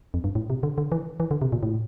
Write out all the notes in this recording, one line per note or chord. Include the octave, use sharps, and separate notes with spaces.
F2
G2
A2
C3
D3
D3
E3
E3
D3
C3
A#2
A2